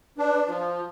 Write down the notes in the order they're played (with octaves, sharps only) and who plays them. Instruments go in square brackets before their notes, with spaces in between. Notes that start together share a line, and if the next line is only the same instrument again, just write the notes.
[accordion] D4 [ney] B4
[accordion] F3 [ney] F4